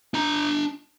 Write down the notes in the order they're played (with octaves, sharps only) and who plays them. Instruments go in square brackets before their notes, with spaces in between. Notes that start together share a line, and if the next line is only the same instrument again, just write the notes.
[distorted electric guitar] D4 A#5